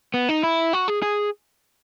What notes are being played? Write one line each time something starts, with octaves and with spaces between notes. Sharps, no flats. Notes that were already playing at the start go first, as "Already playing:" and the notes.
B3
D#4
E4
F#4
G#4
G#4